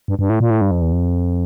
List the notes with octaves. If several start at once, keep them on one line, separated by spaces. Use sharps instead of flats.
G2
G2
A2
A#2
A2
G2
F2
E2
F2